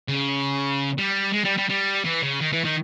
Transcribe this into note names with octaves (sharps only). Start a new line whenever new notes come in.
C#3
G3
G#3
G3
G3
G3
E3
C#3
D#3
E3
D#3